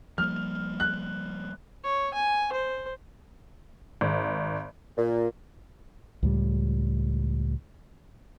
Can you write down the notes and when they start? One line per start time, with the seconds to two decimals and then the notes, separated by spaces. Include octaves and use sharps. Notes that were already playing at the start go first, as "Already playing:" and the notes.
0.18 F3 G3 A#3 F6
0.80 F#6
1.84 C#5
2.14 G#5
2.52 C5
4.01 G#1
4.97 A#2
6.23 C#2 A2 G3